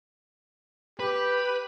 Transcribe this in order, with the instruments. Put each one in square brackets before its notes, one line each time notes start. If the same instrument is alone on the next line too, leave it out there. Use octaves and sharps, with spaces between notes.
[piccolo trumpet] G4 [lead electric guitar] B4